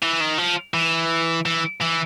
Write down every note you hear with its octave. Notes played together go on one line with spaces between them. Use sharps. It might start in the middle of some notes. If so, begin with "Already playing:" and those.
E3
D#3
F3
E3
E3
E3